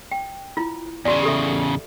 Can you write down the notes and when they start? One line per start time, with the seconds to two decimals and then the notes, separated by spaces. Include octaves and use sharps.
0.12 G5
0.57 E4 F4
1.05 E2 C#3 F#4 D5
1.23 G4 A4 E5